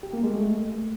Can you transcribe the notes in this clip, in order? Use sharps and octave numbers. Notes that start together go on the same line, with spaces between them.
G4
A#3
G#3
A3